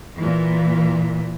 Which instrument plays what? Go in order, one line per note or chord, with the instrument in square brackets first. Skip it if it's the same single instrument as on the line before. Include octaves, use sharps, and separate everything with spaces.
[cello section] A#2 E3